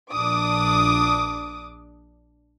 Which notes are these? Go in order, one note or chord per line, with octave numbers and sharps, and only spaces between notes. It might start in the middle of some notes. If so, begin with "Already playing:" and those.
A#1 D4 D6 D#6